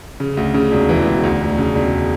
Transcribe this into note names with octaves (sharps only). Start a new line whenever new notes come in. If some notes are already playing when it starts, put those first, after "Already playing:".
C#3
D2
C#3
E1
E3
E1
D2
E1
C#3
E1